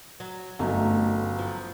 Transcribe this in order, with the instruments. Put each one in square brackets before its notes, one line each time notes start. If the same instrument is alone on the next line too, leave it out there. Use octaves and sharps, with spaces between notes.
[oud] F#3
[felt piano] G1 F#2 [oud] A3 D#4
[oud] F3